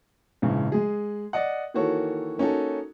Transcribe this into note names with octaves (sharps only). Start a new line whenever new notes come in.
A#1 G#2 C#3 E3
G#3 G#4
D5 D#5 F#5
D#3 E3 A#3 F#4 A4 C#5
A#3 C#4 D#4 F#4 A4